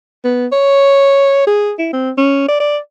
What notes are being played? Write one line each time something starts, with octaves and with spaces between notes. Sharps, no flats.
B3
C#5
G#4
E4
C4
C#4
D5
D5